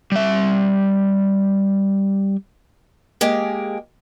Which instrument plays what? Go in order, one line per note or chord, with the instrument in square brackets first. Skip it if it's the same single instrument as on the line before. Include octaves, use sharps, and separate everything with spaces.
[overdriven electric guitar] G3 E5
[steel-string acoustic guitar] G#3 A#3 G4 G#4